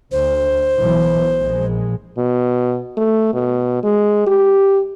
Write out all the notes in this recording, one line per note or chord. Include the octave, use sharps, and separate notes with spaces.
D2 C5
B1 E3
A#1 G#3
B2
A3
B2
G#3
G4